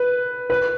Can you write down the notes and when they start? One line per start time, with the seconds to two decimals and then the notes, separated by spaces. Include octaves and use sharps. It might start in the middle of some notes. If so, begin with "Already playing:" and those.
Already playing: B4
0.50 B4